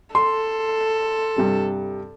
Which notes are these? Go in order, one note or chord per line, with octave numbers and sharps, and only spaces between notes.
A4 C6
G2 C3 G3